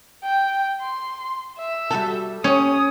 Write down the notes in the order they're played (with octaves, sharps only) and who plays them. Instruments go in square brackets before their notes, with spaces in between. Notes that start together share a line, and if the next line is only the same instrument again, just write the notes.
[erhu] G5
C6
E5
[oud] G3 F#4 A4
[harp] C#4 [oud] G4 C#5 [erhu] D#6